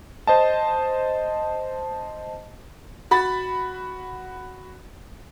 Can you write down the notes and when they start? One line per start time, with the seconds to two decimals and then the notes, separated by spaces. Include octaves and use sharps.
0.27 C5 D#5 A5
3.11 F#4 B5 A6